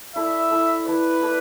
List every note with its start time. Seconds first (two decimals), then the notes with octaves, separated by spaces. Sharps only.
0.16 E4 A4 D5 E5
0.51 E4 A4 D5
0.86 E4 A4 B4 D5
1.21 E4 A4 D5